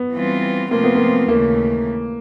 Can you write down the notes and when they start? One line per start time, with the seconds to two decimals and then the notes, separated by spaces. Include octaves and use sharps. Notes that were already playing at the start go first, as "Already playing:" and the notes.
Already playing: B3
0.13 E3 G3 C4 F4
0.71 C3 F3 A3 A#3 C4 F4
0.84 B3
0.96 A#3
1.28 D#2 C#3 E3 A3 A#3